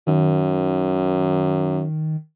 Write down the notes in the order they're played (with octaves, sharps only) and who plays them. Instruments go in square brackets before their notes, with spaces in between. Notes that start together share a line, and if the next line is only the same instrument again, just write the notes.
[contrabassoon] F#2 [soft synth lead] D#3